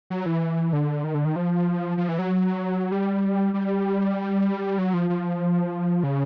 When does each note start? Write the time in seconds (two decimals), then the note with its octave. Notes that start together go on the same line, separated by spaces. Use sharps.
0.10 F#3
0.26 E3
0.73 D3
1.04 D#3
1.14 D3
1.25 D#3
1.36 F3
1.97 F3
2.09 E3
2.19 F#3
2.92 G3
3.54 G3
4.78 F#3
4.94 F3
5.10 F3
6.03 C#3